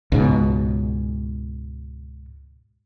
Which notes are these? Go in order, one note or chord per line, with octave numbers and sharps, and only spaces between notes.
C#2 G#2 B2